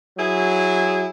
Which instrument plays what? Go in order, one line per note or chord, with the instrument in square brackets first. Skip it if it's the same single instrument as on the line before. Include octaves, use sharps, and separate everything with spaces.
[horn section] F#3 E4 G#4